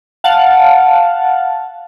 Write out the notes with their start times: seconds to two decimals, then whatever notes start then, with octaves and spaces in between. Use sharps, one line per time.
0.24 F5 F#5 A5